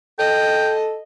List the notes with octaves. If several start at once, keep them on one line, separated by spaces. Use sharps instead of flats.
A4 D#5 G5